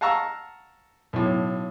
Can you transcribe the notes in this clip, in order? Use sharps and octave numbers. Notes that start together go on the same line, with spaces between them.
F5 F#5 A5 A#5 C#6 E6
B1 A2